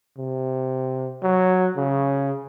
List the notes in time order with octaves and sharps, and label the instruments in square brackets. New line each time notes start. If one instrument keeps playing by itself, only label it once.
[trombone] C3
F#3
C#3